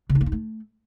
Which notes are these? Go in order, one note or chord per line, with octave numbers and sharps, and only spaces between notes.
C#3
D#4
A#3
D#4
A3